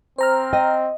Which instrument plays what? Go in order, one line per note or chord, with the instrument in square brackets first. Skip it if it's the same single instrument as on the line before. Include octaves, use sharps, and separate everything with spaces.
[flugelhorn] C4 [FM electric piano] C5 A#5 F6
[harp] D#5 [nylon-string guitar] G5